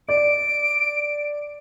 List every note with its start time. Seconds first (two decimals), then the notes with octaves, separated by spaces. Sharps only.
0.09 D5 D7